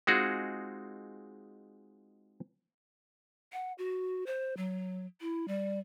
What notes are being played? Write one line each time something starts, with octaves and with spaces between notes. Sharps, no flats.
G#3 C4 D#4 F4 F#4 G#4
F#5
F#4
C5
F#3
E4
G3